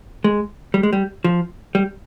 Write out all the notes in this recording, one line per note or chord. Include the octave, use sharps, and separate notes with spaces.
G#3
G3
G#3
G3
F3
G3